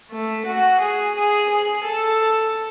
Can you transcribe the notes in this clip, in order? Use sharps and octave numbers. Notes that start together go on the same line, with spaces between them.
A3
F#4
G#4
G#4
G#4
A4